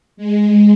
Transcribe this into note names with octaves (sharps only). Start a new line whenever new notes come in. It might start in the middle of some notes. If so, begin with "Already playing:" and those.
G#3